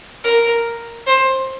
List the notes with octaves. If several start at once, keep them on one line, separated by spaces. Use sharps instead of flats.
A#4
C5